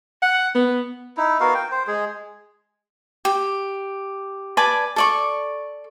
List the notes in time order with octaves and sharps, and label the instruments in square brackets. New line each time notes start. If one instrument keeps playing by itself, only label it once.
[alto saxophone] F#5
B3
[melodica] D#4 E4
B3 F#4 A#4 F5
G5
C5
G#3 G#4
[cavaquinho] G4
B4 D5 G#5 A5
A4 D5 C#6